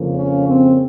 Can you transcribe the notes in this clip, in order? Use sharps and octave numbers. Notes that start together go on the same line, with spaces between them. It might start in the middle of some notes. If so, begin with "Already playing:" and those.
Already playing: F2 C#3 F3 A#3
C#4
C4